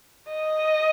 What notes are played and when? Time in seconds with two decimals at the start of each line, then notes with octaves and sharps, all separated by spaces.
0.29 D#5